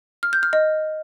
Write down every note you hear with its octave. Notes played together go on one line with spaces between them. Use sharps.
F6
G6
F6
D#5